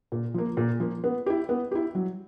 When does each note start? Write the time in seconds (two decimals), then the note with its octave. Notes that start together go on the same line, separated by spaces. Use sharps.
0.12 A#2
0.34 F3 A#3
0.57 A#2
0.80 F3 A#3
1.04 B3
1.26 E4 G4
1.49 B3
1.72 E4 G4
1.95 F#3